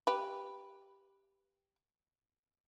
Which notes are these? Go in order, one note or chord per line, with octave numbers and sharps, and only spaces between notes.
G4 B4